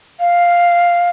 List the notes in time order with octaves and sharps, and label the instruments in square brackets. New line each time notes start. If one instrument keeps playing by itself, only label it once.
[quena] F5